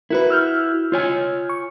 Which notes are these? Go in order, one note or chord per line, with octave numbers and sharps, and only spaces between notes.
E4 F#4 A#4 B4
E6 F6 G6
F4 C#5 G#5
C#6